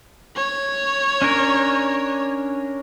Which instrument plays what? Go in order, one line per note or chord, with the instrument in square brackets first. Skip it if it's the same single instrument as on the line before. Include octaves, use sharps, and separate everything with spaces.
[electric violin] C#5
[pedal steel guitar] C#4 D4 A#4